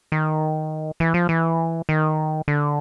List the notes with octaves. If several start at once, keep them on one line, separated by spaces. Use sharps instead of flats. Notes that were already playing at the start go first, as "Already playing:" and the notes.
D#3
E3
F3
E3
D#3
D3